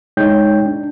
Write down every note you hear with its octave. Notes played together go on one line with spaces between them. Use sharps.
G#3 D#4 C#5 G5 G6
D4